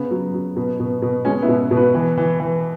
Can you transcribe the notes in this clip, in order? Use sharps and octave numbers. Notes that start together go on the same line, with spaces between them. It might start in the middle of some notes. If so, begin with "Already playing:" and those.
Already playing: C#3 B3
F#3
F#3
B2
B2
B2
B2 G#3 C#4
B3 E4
B2
B2
F#4 B4
E3
E3
E3